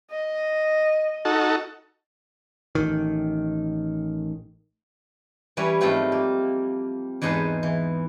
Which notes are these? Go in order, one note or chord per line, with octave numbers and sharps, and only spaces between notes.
D#5
D#4 F#4 A4
A1 D#3
E3 G3 C#4 B4 C#5
G#2 F3 G3 A3 C4 F4
A#3
E2 G#2 D#4 G#4 B4 A5
E3